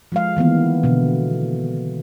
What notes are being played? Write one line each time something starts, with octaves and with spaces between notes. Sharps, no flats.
F3 G#3 F5
D#3 E3 A#3 B3
B2 D3